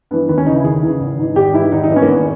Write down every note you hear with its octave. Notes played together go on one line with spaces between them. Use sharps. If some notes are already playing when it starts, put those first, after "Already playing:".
G2 E3 B3
D#2 B3
C#4
C#3 E3 D#4
E4
D#2 G#4
C#3 E3
G#1
G#2 E3
G#1 G4
G#2 E3 E4
G#1 D#4
D#4
G2 E3
C#4
A#3
G#1 B3